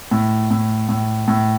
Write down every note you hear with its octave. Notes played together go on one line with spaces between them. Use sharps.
A2
A2
A2
A2